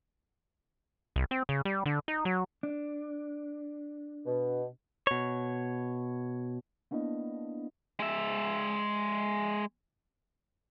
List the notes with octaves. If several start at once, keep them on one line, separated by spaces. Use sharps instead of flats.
C2
C4
C#3
G3
D3
D#4
F#3
D4
B2
B2 C#5
A#3 B3 D4 E4 D#5
G#3 E5